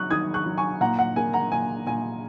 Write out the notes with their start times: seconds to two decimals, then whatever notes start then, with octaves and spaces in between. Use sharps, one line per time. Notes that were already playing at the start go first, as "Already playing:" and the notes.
Already playing: D#3 F#3 C#6 D#6 F#6
0.10 D#3 D#6 G#6
0.34 C#6 F#6
0.46 F#3
0.57 G#5 C#6
0.81 A#2 F#5 A#5
0.99 F#5
1.16 A#3 G#5
1.33 F#5 A#5
1.52 A#2 G#5
1.86 A#2 G#5